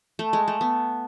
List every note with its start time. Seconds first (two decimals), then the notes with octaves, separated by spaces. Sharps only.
0.19 A3
0.33 G#3
0.48 A3
0.61 B3